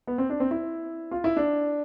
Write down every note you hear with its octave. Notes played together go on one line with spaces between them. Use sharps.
B3
C4
D4
C4
E4
F4
E4
D4